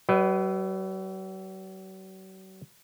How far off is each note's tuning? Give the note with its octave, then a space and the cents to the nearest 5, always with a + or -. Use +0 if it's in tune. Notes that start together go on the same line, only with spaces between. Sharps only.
F#3 +40 B4 +0 D#5 +0